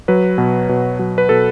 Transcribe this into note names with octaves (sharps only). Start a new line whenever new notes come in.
F#3 B4
B2
B2
F#3
B4
B2 A4